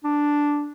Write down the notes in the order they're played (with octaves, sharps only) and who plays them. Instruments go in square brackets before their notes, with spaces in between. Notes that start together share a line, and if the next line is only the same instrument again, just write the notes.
[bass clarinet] D4